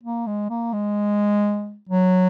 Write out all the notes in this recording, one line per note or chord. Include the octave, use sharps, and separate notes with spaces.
A#3
G#3
A#3
G#3
F#3